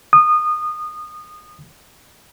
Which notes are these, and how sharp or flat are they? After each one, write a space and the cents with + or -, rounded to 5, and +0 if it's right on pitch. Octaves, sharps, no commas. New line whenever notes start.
D#6 -25